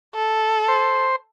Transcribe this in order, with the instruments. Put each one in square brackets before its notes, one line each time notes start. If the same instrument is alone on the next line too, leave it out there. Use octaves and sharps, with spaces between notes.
[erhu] A4
[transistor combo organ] C5